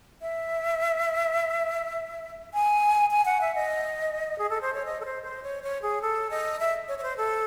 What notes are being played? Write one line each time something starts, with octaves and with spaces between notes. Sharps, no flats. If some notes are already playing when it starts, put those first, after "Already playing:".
E5
G#5
G#5
F#5
E5
D#5
G#4
A4
C5
C#5
D#5
A4
C5
C5
C#5
C#5
G#4
A4
D#5
E5
C#5
C#5
C5
A4